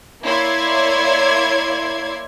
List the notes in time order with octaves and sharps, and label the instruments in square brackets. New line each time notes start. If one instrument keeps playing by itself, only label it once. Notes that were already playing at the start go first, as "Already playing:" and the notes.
[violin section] A#3 E4 C#5 D5 C6 G#6